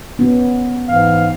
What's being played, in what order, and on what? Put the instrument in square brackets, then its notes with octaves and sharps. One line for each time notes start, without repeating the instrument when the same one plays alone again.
[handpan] B3 C#4
[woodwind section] G#2 E3 F5